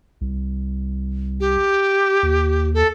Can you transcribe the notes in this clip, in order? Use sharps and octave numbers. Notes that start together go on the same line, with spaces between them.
C2
G4
D#2
A4